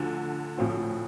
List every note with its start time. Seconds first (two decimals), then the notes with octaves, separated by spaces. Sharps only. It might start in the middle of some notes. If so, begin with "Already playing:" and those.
Already playing: D2 D3 F3
0.58 A#1 A2 F3 C4 F4